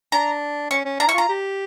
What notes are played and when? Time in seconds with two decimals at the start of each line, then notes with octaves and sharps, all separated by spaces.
0.12 D4 A#5
0.71 C#4 C#6
0.85 C#4
1.00 D4 A#5
1.07 E4 C#6
1.14 F4 A#5
1.29 G4